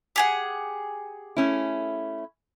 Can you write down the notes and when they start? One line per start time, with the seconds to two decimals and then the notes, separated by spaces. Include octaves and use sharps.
0.16 G4 G#4 F#5
1.37 A3 C#4 E4